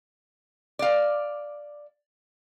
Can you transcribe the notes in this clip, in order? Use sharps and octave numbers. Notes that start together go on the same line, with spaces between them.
D5 F5